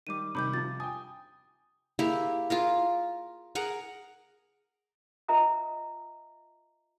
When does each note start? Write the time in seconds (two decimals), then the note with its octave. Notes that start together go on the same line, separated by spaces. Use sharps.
0.07 D#3 G3 D6 D#7
0.35 C3 D#3 G3 B5 D6 G6
0.54 C3 F3 A6
0.80 G5 G#5 D#6
1.99 A#3 E4 G4 G#4
2.50 F4 G#4 A#4
3.55 G#4 A#4 F#5 A#5
5.28 F4 A#4 D#5 E5 A#5 D#6